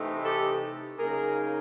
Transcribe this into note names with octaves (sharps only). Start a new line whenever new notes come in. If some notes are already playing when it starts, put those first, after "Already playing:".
Already playing: C3 E3 A3 C4 D#4
G4 A4
C#3 F#3 A#3 D#4 G#4 A#4